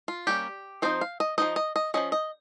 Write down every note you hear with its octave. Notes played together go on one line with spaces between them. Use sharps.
F4
G3 A#3 C#4 G4
F3 C4 D#4 C5
F5
D#5
F3 C4 D#4 D#5
D#5
D#5
F3 G#3 C#4 D#5
D#5